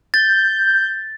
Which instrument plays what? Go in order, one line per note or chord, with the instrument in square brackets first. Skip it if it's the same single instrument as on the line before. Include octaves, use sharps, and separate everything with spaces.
[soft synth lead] G6 [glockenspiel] A6